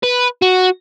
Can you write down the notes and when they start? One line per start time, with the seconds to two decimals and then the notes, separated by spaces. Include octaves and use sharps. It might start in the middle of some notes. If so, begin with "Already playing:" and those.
0.03 B4
0.42 F#4